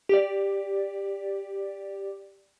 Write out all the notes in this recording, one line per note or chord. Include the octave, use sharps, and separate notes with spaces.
G4 D5